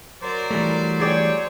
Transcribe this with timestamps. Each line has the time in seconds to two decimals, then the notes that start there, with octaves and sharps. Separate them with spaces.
0.22 F#3 A#4 C5 D5
0.51 E3 G3 A3
1.00 G#4 C#5 D5 G5